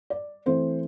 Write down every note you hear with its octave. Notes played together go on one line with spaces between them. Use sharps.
D5
E3 A3 C4 C5